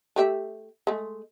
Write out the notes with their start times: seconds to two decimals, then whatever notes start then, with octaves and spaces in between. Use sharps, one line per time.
0.16 A3 G4 E5
0.87 G#3 A3